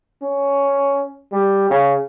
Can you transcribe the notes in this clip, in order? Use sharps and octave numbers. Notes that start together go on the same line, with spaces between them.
C#4
G3
C#3